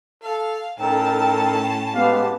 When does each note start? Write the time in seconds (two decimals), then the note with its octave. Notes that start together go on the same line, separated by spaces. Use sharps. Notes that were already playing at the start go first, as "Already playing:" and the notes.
0.24 A4 F5
0.79 A2 C#4 D#4 A4 A#4 G5 A5
1.94 G#3 B3 G4 F5